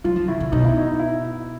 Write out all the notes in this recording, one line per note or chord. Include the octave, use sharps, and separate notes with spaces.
F#3 F4
F3
C#3 E4
D3
B2 D#4
E4
D#4
E4